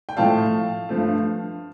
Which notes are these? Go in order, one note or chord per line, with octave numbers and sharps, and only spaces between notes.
G5
A2 F3 A3 F5 A5
G2 F3 A3